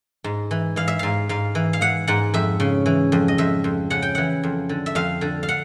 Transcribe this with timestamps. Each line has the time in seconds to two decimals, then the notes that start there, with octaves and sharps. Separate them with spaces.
0.24 G#2
0.51 E3
0.76 E3 F5
0.88 E5
0.99 G#2 F5
1.29 G#2 F5
1.55 E3
1.73 F5
1.81 E3 F#5
2.07 G#2 F#5
2.34 F2 E5
2.60 C#3
2.86 E3
3.12 F2
3.28 D#5
3.38 F2 E5
3.64 F2
3.90 C#3 F#5
4.02 G5
4.15 E3 F#5
4.44 F2
4.69 D3
4.86 E5
4.95 F2 F5
5.21 D3
5.43 F5
5.49 F#5